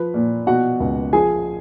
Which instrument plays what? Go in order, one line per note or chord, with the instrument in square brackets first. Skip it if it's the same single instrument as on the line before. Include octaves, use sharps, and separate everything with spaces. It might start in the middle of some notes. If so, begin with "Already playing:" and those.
Already playing: [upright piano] F3 B4
A#2
B2 F#4 F#5
C#2
F3 G#4 G#5